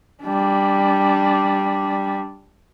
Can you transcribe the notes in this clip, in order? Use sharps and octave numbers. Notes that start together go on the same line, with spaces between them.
G3 D4